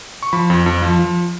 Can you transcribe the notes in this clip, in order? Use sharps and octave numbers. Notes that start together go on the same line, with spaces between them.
C#6
F3 B5
F2
F2
F3
F3